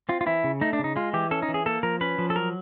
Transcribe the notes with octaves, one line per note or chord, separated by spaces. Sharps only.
C4 F4
F4
E3 E4
C#3
A3 D#4
D4
C#3 D#4
G#3 F4
E3 G4
C#4 A4
D#4
E3
G#4
A#3 A4
F3 A#4
C#4 B4
F3
A4
F#3 A#4